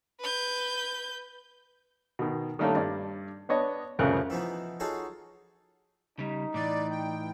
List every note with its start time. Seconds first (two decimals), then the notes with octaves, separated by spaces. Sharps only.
0.21 B4 G6
2.19 B2 D#3
2.59 D#3 G3 A3 A#3 C#4 D4
2.75 G2 D5
3.49 B3 D4 C#5 D#5
3.99 C2 F2 A2 C#3 A#4 F#6
4.30 E3 F3 B3 D#4
4.80 D#4 F4 F#4 G#4 A4 C#5
6.19 C#3 G3 D#4
6.54 A2 E3 D5
6.91 G5